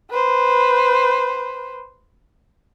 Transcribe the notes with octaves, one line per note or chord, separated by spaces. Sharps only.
B4 C5